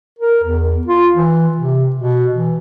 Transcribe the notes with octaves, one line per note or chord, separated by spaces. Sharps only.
A#4
E2
F4
E3
C3
B2
E3